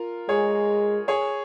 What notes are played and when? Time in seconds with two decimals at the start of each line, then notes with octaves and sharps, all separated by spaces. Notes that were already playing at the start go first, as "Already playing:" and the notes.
Already playing: F4 A#4
0.29 G#3 G#4 C#5
1.08 G#4 C#5